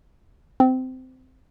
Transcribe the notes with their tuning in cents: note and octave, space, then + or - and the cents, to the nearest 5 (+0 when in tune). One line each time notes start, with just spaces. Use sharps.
C4 -20